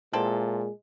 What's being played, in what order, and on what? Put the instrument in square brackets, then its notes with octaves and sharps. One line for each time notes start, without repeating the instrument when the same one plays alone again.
[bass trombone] A#2 [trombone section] G#3 [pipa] C4 E4 A4